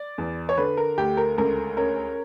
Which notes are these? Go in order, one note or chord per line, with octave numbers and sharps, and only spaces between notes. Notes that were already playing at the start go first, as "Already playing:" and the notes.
Already playing: D5
E2
C#5
D3 B4
A#4
D2 G4
A#4
C#2 A#4
C#4 A#4